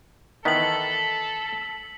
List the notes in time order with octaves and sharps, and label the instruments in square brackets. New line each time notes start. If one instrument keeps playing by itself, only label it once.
[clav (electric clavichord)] D#3 E3 B3 [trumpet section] A4 [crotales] B6 F#7